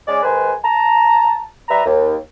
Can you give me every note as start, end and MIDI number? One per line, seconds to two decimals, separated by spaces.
0.07 0.22 56
0.07 0.22 61
0.07 0.22 74
0.23 0.53 44
0.23 0.53 51
0.23 0.53 71
0.23 0.53 72
0.23 0.53 80
0.64 1.43 81
0.64 1.43 82
1.69 1.83 55
1.69 1.83 71
1.69 1.83 76
1.69 1.83 82
1.84 2.16 39